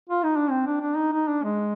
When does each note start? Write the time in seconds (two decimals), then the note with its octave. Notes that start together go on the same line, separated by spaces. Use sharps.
0.09 F4
0.23 D#4
0.37 D4
0.50 C4
0.66 D4
0.81 D4
0.96 D#4
1.13 D#4
1.28 D4
1.44 G#3